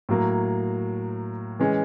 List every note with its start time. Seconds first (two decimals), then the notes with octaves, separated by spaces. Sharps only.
0.09 A2 F#3 A#3
1.60 E3 G#3 C#4